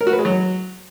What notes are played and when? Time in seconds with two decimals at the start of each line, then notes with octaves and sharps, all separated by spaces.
0.01 A#4
0.07 F#4
0.13 B4
0.19 G#3
0.25 F#3